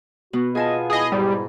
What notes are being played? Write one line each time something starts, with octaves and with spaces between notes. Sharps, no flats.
B2 B3 F#4
B3 F4 G#4 D#5 G#5 A5
E4 G#4 D#5 D#6
G#2 G3